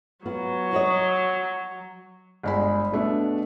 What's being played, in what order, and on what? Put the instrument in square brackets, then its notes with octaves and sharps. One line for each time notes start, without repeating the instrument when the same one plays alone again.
[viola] F#3 [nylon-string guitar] B3 F4
[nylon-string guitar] F#4 C#5 D#5
[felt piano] G1 G#3 B5
B2 A3 D4